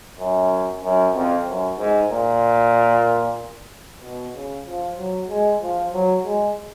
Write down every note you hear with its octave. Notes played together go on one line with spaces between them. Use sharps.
F#2
F#2
F2
F#2
G#2
A#2
B2
C#3
F3
F#3
G#3
F3
F#3
G#3